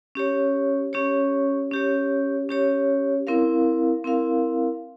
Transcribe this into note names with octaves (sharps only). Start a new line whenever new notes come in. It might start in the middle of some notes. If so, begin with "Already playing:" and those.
C#4 G4 C#5
C#4 G4 C#5
C#4 G4 C#5
C#4 G4 C#5
C4 E4 A#4 F5
C4 E4 A#4 F5